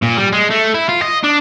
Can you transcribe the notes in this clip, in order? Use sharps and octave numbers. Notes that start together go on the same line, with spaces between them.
A#2
G3
G#3
A3
E4
F4
D#5
D4